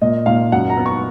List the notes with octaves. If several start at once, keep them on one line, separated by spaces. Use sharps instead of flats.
A#2 D#5
A#2 F5
F#2 F#5
A#5
B3
C#6